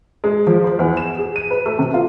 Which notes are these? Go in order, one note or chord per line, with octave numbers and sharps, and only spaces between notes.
G#3
F3
C5
E2
E7
G#4
D#7
B4
A3
C3
F4